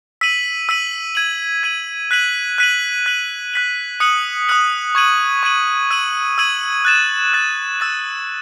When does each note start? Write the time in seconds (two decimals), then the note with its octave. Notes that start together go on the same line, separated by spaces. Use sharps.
0.21 E6 B6 D#7 F#7
0.69 E6 B6 D#7 F#7
1.15 G#6 D#7 F#7
1.63 G#6 D#7 F#7
2.11 F#6 B6 D#7 F#7
2.58 F#6 B6 D#7 F#7
3.06 F#6 B6 F#7
3.54 F#6 B6 F#7
4.00 D#6 F#6 C#7 F#7
4.49 D#6 F#6 C#7 F#7
4.95 C#6 G#6 D#7 F#7
5.43 C#6 G#6 D#7 F#7
5.91 E6 G#6 D#7 F#7
6.38 E6 G#6 D#7 F#7
6.85 F#6 A6 E7
7.33 F#6 A6 E7
7.80 E6 A6 E7